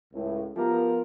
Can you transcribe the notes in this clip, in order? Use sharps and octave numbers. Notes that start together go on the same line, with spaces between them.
C#2 A2
F3 B3 F4 G4 A#4